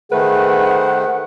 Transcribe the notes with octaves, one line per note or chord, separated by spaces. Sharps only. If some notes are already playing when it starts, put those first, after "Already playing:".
D#3 A3 G#4 B4 C5 F#5